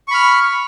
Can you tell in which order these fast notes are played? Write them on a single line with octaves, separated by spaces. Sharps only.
C#6 B5 F6